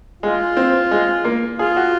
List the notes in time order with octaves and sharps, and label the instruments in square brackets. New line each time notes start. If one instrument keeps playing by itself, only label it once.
[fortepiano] G#3 [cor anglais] F4
[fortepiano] C4
G#3
A#3
[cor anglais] F4 [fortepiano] G#4
[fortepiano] F#4